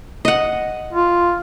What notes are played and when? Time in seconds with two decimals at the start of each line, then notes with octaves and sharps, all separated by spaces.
0.25 D#5 F#5
0.93 F4